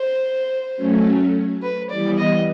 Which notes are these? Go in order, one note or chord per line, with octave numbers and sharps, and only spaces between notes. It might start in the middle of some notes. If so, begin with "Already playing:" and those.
Already playing: C5
F#3 A3 C#4
B4
E3 G3 B3 D5
D#5